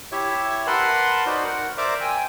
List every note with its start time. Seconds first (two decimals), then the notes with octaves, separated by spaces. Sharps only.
0.12 E4 G4 C#5 E5
0.67 A#4 B4 F#5 A5 B5 C6
1.26 D#4 F#4 C5 D5
1.44 A#4 F#5
1.78 A#4 C5 D5 E5 A#5 D6
2.01 G5 G#5